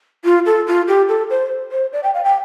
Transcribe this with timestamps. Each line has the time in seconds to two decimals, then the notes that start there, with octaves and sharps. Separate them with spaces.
0.25 F4
0.46 A4
0.67 F4
0.88 G4
1.08 A4
1.30 C5
1.72 C5
1.93 D5
2.03 G5
2.14 F5
2.24 G5